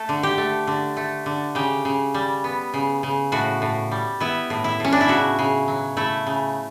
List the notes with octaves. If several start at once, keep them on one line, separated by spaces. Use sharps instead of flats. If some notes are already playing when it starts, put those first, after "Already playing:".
Already playing: A3 A4
D3
G4
A3
D3
A3
D3
C#3 G4
C#3
G3
B3
C#3
C#3
A2 F#4
A2
G3
B3 E4
A2
E4
A2 C#4
D4
E4
C#3 F#4
C#3
F#3
A3 E4
C#3